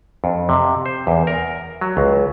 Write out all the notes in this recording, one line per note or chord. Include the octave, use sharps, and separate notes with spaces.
F2
C3
C5
E2
A#4
F#3
C#2